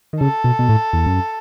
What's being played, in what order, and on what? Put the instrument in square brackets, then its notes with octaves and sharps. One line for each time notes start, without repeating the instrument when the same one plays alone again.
[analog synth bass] D#3
[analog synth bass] C#3 [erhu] A4
[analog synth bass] B2
B2
A2
E2
F#2